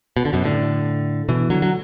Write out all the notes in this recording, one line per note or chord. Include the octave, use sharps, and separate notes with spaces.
B2
D3
F#2 B2
A2 D3
B2 E3
D3 F#3
F#3